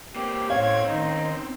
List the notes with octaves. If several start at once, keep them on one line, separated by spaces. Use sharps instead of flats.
A#3 C4 G4
A2 C4 C#4 C#5 F5 G#6
D#3 D#4